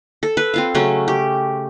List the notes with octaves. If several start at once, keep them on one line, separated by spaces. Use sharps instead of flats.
A4
B4
C4 F4 F5
C#3 F#3 A3 C#4
G4